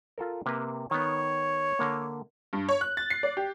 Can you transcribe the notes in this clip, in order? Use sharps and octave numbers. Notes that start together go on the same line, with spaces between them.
F4 A4 A#4
C3 A#3 B4
D#3 B3 C#5
D3 A#3
G2
C#5
F#6
A6
C7
D5
G4